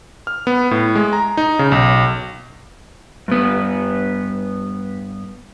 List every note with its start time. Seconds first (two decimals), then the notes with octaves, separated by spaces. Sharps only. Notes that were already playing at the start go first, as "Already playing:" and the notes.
0.27 F6
0.47 B3
0.71 A2
0.95 G#3
1.13 A#5
1.37 D#4
1.59 C#3
1.72 B1
3.28 G2 B3